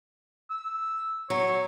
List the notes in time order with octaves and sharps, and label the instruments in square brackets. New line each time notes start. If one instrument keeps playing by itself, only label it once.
[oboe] E6
[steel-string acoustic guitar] F#3 [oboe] C#5